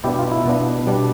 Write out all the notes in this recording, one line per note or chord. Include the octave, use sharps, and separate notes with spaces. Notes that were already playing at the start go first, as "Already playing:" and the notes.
B2 B3 D4 E4 G4
F4
E4
B2 B3 D4
B2 G3 D4